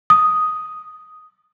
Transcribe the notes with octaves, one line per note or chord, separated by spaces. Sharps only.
D#6